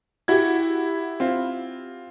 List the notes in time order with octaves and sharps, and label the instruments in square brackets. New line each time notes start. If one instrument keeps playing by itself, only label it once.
[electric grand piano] E4 G#6 [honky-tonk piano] F#4 G4
[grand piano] C4 F4